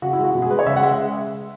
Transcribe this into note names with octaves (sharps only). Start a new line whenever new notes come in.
C#3 F#4
G#3 E4
F#4
B2
G#4
G#3 B4
C#5
C#3 E5
F#5
G#3 E5